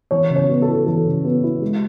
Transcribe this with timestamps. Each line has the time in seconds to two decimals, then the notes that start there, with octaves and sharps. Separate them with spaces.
0.11 E3 C#5
0.30 C#3
0.36 C#5
0.50 B3
0.62 A4
0.68 E4
0.86 E3 A4
1.06 C#3
1.25 B3
1.44 E4
1.61 G#3